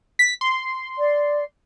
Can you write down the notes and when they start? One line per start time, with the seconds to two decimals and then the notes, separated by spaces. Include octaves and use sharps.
0.19 B6
0.41 C6
0.99 D5